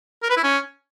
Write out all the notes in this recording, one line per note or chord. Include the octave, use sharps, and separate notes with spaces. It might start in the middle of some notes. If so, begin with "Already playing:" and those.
A#4
B4
E4
C#4